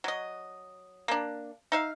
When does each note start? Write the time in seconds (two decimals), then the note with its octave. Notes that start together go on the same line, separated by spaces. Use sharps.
0.04 F#3 D#5
1.08 A#3 D4
1.72 D#4 E5 F5